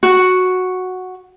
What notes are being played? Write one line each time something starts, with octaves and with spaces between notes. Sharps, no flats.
F#4